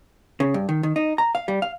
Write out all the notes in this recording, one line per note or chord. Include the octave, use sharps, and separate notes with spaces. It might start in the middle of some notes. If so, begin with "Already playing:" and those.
C#3
G2
D#3
D#3
D#4
A#5
F5
G3
F5